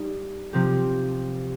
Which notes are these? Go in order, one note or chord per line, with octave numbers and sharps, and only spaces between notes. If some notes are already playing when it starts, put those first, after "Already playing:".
Already playing: G3 D#4 G4
C3 F3 C4 G4